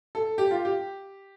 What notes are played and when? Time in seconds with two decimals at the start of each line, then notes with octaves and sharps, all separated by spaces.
0.15 A4
0.38 G4
0.51 F4
0.65 G4